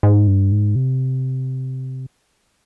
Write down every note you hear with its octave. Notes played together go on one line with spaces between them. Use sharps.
G#2
G2
G#2
C3